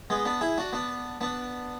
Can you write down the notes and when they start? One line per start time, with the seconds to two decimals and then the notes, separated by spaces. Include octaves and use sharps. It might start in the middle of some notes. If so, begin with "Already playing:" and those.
0.10 G#3 B3
0.25 B3 D4
0.41 E4 G#4
0.58 D4 F#4
0.73 B3 D4
1.21 B3 D4